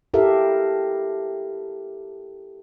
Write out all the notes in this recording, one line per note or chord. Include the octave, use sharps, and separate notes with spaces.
E4 G4 A4 A#4 E5 F5